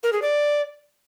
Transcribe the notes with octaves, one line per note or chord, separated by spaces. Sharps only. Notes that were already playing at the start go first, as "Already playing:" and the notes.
A#4
G#4
D5